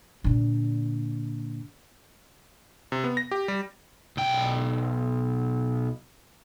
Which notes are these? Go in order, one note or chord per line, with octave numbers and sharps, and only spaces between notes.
A#2 D3
C3
B3
A#6
G4
G3
B1 G5